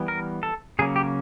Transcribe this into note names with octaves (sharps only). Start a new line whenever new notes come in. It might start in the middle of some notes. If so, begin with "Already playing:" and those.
Already playing: E3 G3 B3
A#4
A4
C#3 F#3 A#3 C#4 G#4
G4